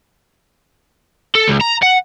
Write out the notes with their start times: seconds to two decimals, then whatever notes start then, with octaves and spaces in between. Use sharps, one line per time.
1.35 A4
1.48 C#2
1.61 A#5
1.83 F#5